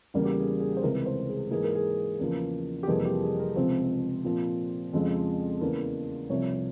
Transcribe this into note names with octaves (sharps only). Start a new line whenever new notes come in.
E2 C#3 G3 A#3
G4
G#4
G#4
C5
C#2 C3 E3 A#4
C5
G#4
G#2 E3 A#3 G#4
A#4
G#4
E2 C#3 F3 A#3
G4
F2 C3 E3 G3 A#3 G#4
G4
G#4
A#4
C#2 C3 F3 C4 C5
A#2 F3 C4
F2 C#3 F3 G#3 C4
E2 C#3 E3 A#3
C2 C3 F3 C4 C#5